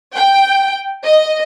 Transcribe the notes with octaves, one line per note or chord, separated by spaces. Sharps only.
G5
D#5